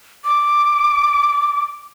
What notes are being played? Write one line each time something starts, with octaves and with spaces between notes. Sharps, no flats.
D6